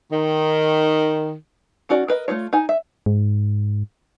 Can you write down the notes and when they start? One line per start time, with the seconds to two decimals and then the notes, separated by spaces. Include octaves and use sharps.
0.11 D#3
1.89 D#3 C#4 F#4 D5
2.08 A#4 B4 D#5
2.28 A3 A#3 F4 C#5
2.53 D#4 G#5
2.69 E5
3.06 G#2